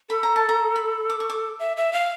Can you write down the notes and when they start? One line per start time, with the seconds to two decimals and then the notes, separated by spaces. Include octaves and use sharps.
0.10 A4 B5
0.23 A#5
0.36 A5
0.49 A#5
0.76 B5
1.10 D6
1.20 C#6
1.30 D6
1.59 E5
1.77 E5
1.93 F5